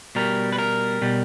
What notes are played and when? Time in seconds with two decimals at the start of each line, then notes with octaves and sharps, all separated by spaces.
0.15 B2 G3 A#4
0.53 B4
0.58 A#4
1.02 B2 G3